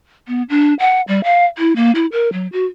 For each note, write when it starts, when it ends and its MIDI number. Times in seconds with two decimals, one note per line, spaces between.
0.28 0.43 59
0.50 0.74 62
0.79 1.02 78
1.08 1.23 55
1.24 1.45 77
1.58 1.73 64
1.76 1.91 58
1.95 2.06 64
2.12 2.31 70
2.33 2.47 54
2.53 2.65 66